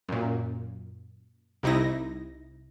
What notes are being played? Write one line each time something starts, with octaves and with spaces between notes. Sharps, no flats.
F#2 A#2
C2 C3 D#4 E4 A#6